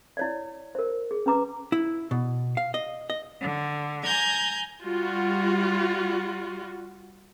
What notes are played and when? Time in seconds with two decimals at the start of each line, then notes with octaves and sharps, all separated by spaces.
0.17 E4 C#5 D5
0.75 A#4 C5
1.11 G#4
1.26 C#4 B4 A#5 D6
1.72 E4
2.11 B2
2.57 F5
2.74 D#5
3.10 D#5
3.40 D3
4.03 G#5 A#5 G6 G#6
4.83 G3 F4 F#4